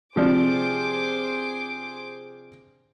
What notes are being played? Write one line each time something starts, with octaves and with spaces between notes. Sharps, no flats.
C3 F3 D4 G#4 C5 D6